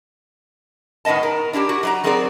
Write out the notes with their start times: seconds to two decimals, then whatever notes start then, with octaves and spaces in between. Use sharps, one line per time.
1.05 A2 D#3 B3 D#5 A5
1.23 A#4
1.53 D4 E4 F4 G4
1.69 E4 F#4
1.83 F#3 D5 A#5
2.04 F#3 C4 G#4 A#4 B4 D5